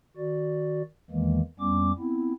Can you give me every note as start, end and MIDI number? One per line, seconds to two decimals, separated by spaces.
0.17 0.82 51
0.17 0.82 66
0.17 0.82 74
1.11 1.41 40
1.11 1.41 51
1.11 1.41 52
1.11 1.41 56
1.11 1.41 58
1.60 1.92 41
1.60 1.92 55
1.60 1.92 59
1.60 1.92 61
1.60 1.92 86
1.99 2.33 59
1.99 2.33 60
1.99 2.33 64